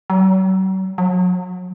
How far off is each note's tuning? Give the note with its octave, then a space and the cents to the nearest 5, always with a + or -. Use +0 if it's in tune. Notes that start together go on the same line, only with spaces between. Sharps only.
F#3 +40
F#3 -35